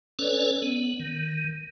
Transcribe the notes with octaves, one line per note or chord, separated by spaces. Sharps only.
C#4 A4 B4 C#5 D5
B3
D#3